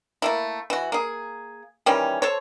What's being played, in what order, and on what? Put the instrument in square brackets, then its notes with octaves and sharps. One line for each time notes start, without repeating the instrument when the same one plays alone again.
[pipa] A3 A#3 E4
E3 F#4
A#3 G#4
D#3 E3 G3 C#4
A4 C5 C#5